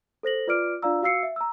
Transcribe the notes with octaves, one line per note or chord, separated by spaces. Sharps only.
A4 C5 A#6 F#7
F4 B4 D5 D6 F6 D7
D4 F4 D5 F5 A#5 E6
F#4 F5 E6 C7 C#7
E5
A#5 E6